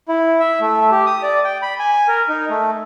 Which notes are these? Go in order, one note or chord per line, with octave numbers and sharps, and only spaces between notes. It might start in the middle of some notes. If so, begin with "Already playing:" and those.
E4
E5
A3
G4
D#6
D5
G5
B5
G#5
A#4
D#4
A3